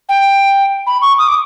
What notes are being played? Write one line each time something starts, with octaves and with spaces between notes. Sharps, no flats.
G5
B5
C#6
D#6
D6